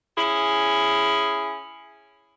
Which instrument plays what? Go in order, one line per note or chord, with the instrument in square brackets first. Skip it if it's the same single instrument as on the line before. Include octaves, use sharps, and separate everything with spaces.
[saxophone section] C#4 E4 G#4